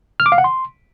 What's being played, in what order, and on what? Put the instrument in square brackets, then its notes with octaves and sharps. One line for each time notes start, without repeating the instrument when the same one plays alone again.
[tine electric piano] F6
D6
F5
F#5
C6